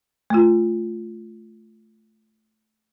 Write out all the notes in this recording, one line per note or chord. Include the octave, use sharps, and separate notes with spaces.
A3 F4